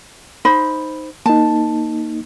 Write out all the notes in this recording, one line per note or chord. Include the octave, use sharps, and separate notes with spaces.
D#4 C5 B5
A#3 D#4 A5